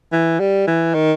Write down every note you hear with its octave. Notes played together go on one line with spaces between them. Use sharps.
E3
G3
E3
D#3